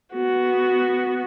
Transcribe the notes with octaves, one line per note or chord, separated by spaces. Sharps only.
B3 F#4